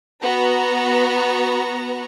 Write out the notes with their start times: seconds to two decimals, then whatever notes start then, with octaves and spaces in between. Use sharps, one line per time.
0.22 B3 F#4 A#5